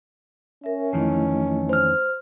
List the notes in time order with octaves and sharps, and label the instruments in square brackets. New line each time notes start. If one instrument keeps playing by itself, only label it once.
[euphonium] C#4 [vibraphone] A#4 E5
[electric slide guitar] F2 D#3 E3 [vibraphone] A3 E4 D#5
[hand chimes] C5 F6